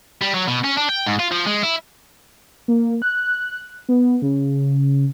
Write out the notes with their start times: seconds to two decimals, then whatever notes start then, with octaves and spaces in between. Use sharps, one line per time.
0.21 G3
0.34 F#3
0.48 B2
0.65 C#4
0.77 D4
0.89 G5
1.06 G#2
1.20 F4
1.32 F3
1.47 G#3
1.63 E4
2.68 A#3
3.02 F#6
3.89 B3
4.22 C#3